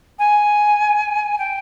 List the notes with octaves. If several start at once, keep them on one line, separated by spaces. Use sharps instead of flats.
G#5
G5